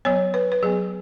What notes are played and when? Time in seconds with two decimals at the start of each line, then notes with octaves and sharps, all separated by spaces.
0.05 F#3 B3 C#5
0.34 B4
0.52 B4
0.63 F#3 B3 G#4